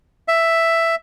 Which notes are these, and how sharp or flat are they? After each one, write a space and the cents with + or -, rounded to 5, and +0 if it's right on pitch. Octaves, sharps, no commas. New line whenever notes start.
E5 +5